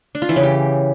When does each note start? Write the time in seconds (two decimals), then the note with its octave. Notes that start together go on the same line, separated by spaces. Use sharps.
0.15 D4
0.22 F4
0.29 E3
0.36 C#3
0.43 G4